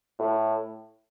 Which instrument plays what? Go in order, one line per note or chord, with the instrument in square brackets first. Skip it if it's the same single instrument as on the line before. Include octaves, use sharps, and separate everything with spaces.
[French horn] A2